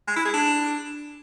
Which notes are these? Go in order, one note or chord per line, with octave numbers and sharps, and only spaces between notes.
G#3
E4
G#4
D4